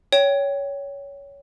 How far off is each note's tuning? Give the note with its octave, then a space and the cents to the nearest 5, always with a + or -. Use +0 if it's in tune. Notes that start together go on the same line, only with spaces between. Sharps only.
C#5 +15 G5 +0